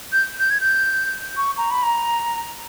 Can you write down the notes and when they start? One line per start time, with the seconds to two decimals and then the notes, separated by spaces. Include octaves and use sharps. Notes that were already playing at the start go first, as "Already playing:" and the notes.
0.12 G6
0.39 G6
0.51 G#6
0.61 G6
1.37 C#6
1.58 A#5
1.71 B5
1.83 A#5